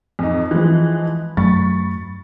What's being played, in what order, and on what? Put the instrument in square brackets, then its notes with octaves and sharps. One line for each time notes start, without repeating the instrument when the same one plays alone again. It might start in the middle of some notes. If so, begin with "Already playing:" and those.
[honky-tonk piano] F2 D#4
E3 F3 G#3
[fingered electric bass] F#2 F#3 A3 [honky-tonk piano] B5 C#6 A6